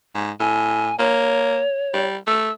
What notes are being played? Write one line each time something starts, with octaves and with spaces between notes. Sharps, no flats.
G#2
A2 G#5
A#3 C#5
G3
A3 E6